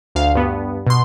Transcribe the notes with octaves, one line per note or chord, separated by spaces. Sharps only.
D2 F5
G2 B3
B2 C6